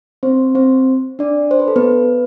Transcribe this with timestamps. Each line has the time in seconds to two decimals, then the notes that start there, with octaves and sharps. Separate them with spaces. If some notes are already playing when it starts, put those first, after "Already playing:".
0.23 C4 C5
0.55 C4 C5
1.19 D4 D5
1.51 C5
1.60 B4
1.68 A4
1.76 B3 B4